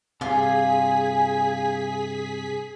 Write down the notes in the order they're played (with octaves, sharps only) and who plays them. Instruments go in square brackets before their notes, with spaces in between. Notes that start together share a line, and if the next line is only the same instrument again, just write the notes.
[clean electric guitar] G2 C3 [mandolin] F4 F5 [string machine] G#4 B6 [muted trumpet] G#5